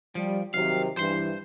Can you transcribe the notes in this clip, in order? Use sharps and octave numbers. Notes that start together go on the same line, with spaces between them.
F3 G3
C3 D#3 F#3 F5
G2 E3 C5 C6